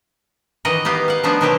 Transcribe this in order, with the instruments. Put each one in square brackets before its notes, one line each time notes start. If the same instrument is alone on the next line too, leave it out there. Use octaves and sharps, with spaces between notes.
[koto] D#3 E3 A#4 D#5 F#5
B3 D#4 G4 F5
F5 F#5
F3 A3 B3 D4 D#4
B2 D#3 F#3 A#3 C4 G4